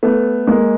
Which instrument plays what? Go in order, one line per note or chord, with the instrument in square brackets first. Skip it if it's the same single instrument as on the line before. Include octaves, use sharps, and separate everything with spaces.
[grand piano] A3 B3
G#3 A#3